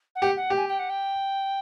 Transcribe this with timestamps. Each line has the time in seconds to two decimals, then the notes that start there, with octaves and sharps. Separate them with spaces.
0.15 F#5
0.22 G4
0.36 F#5
0.50 G4
0.57 G#5
0.68 G5
0.79 F#5
0.89 G5